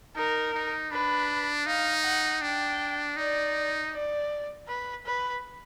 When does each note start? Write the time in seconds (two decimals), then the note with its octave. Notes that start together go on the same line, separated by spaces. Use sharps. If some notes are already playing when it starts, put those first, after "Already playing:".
0.16 D#4 A#4
0.54 D#4
0.91 D4 B4
1.66 D#4 F5
2.04 F#5
2.42 D4 G5
3.17 D#4 D5
3.92 D5
4.68 B4
5.06 B4